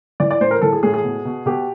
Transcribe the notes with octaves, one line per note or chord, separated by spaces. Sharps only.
E3 D5
D5
A2 C5
A#4
E3 A4
G#4
A2 G#4
G#4
B2
B2
B2 G4